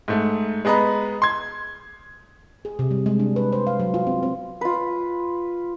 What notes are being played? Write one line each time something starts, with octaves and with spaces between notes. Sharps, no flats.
G#2 A3
G#3 B3 D#5 A#5 B5
C6 G#6
G#4
C3
G3
G#3
D4
B4
C5
F5
F#3
F4
C4
C4
F4 B4